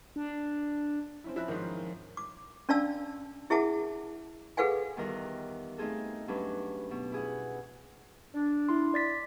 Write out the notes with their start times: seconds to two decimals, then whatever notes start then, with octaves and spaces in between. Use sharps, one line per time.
0.16 D4
1.24 C4 C#4 E4
1.36 F3 E4 E6 F#6 A#6
1.48 G#2 D#3 F3
1.60 C#4 F4
2.17 D6
2.69 C#4 D4 D5 F5 A5 E6
3.50 E4 G#4 E5 F#5 A5 D6
4.57 G#4 A4 B4 F5 F#5 G#5
4.97 E2 D#3 G3 F4 A#4 F#6
5.78 A3 C4 D#4 F4 G#4 A4
6.28 G2 F#3 C#4 D4 B4
6.91 B2
7.12 E4 G#4 F#5
8.35 D4
8.69 E4 C6
8.94 D5 A6 B6